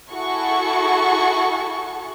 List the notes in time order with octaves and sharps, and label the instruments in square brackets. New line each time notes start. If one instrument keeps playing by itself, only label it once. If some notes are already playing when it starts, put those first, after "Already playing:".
[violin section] E4 F#4 G#4 A4 C#6